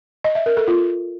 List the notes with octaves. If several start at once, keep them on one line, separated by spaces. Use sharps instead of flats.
D#5
E5
A#4
A4
F4